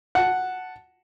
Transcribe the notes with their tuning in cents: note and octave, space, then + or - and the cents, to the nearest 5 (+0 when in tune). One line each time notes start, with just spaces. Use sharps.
F#5 +0 A5 +0